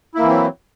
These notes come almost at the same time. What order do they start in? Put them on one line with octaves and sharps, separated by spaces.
E4 A#3 E3 C4 F#3